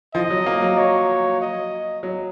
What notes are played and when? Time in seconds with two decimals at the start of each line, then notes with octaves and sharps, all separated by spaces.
0.14 F3 D#5
0.30 F#3
0.46 A#3
0.62 F#3
0.78 C#5
1.41 D#5
2.03 F#3